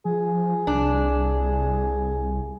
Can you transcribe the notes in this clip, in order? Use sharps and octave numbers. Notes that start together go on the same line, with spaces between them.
F3 G#4
C2 D4